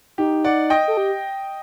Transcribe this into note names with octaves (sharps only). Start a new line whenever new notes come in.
D#4 G4
D5 F#5
D#5 G5
A4
G4